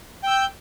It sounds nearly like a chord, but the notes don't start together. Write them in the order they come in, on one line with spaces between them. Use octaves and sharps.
G5 E6 G6